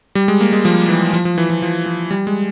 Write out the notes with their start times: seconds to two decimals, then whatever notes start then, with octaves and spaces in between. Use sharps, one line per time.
0.15 G3
0.28 G#3
0.40 A#3
0.53 G#3
0.65 F3
0.89 E3
1.13 F3
1.25 F3
1.38 E3
1.50 F3
1.62 F3
1.86 F3
2.11 G3
2.27 G#3